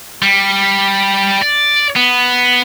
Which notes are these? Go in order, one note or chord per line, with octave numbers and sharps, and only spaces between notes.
G3
D5
B3